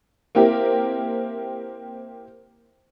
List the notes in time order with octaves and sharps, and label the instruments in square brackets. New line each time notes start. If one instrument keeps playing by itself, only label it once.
[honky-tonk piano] A#3 C4 E4 G4 A#4